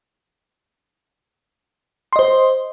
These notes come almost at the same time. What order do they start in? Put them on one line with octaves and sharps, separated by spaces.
C6 D#5 C5